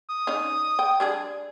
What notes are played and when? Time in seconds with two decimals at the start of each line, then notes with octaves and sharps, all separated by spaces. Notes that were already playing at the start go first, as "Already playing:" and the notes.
0.10 D#6
0.27 C#4 D#4
0.79 G5
1.00 G3 D4 G#4